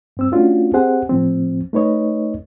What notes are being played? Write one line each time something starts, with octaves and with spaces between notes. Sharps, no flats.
G2 C4 E6
A3 C#4 D4 F4 F#4
C4 G4 G#4 C5 F#5
A2 F3 C4
A3 D#4 B4 C#5 D#5